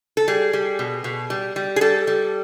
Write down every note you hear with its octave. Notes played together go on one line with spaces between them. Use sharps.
A4
G3 G#4
G3
B2
B2
G3
G3
G#4
G3 A4
G3